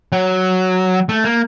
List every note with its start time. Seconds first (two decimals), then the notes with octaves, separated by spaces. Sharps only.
0.12 F#3
1.09 A3
1.24 A#3